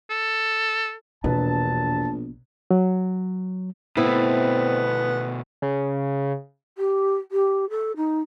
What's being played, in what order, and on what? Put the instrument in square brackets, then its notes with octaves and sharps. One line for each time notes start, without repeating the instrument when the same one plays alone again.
[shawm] A4
[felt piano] E1 B4 [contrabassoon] A#1 [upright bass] B2 [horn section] A5
[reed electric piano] F#3
[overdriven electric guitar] B2 A3 [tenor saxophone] B3 [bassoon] C4 [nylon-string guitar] E4
[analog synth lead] C#3
[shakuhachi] G4
G4
A4
D#4